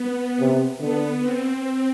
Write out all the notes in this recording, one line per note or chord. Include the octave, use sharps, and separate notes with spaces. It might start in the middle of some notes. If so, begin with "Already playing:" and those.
Already playing: B3
C3
D3 B3
C4